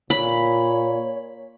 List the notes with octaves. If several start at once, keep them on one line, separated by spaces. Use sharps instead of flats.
A#2 C#5 B5